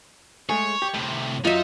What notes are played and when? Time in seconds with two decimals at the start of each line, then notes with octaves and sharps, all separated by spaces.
0.49 G#3 A3 G#4 C#5
0.82 G4
0.94 A2 C3
1.45 F#2 D#4 F4 D#5 E5